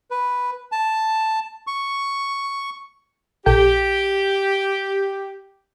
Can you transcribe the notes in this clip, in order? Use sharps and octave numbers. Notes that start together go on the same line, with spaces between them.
B4
A5
C#6
A#1 G4 A4 G5